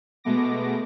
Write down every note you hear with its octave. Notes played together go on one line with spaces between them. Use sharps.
B2 G#3 A3 B3 D6 A#6